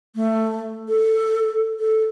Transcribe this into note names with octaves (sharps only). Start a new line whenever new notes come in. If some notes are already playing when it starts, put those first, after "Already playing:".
A3
A4
A4